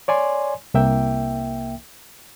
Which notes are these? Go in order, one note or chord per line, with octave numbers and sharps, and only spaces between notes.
C#5 D5 G#5 C6
C2 A#3 E5 G5